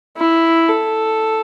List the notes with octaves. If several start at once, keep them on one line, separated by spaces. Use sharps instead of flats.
E4
A4